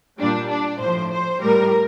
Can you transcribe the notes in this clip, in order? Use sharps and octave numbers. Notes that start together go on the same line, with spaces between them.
A#2 G3 D4
D4
A2 F3 C5
C5
A2 G3 A#4